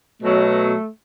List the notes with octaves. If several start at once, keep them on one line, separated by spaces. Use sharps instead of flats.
B2 F#3 A3